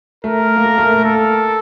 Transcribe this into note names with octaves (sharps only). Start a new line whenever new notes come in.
A3 A#4
A#3
A3
A3
A#3
A4